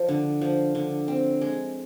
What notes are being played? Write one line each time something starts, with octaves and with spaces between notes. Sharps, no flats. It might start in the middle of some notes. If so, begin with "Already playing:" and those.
Already playing: F3
D3
F3
D3
C4
G#3